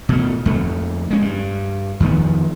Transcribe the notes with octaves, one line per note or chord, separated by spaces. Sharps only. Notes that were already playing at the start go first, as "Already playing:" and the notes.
B2 A3
F2 D3 A3
G#3 C#4
G2
F2 D#3 F3 B3